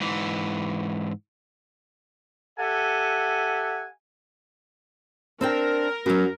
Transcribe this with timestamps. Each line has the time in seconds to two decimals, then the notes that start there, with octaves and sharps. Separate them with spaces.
0.01 G#2 E3
2.59 G4 A4 E5 F#5 G#5
5.41 C4 D4 A#4 G5
6.06 F#2 F#3 B3